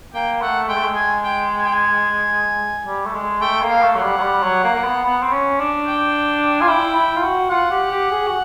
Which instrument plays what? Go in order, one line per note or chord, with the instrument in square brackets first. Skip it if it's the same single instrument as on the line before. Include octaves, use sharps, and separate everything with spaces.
[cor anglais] A#3 [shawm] G5
[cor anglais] A3 [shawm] F#5
[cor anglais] G#3 [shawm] G5
[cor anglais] A3
G#3
[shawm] G#5
G5
G#5
G5
G#5
[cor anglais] G3
A3
G#3
[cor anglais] A3 [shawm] G5
[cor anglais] A#3
[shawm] F5
[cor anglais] A3
[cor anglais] F#3 [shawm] F#5
[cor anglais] G3
F#3
G3
F#3
A#3
A#3
B3
B3
C4
C#4
D4
[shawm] G5
[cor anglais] F4 [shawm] G#5
[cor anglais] E4 [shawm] G5
[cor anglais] E4
F4
F#4
[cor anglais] F4 [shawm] F#5
[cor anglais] G4
G4
G#4
F#4